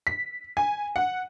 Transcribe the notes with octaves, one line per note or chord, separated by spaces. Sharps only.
B6
G#5
F#5